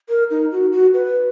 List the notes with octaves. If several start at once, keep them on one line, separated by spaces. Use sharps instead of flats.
A#4
D#4
F#4
F#4
B4